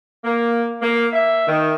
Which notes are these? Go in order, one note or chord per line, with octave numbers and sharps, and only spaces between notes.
A#3
A#3
E5
D#3